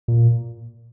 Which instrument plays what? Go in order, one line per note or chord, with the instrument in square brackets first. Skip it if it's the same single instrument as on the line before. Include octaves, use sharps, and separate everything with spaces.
[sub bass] A#2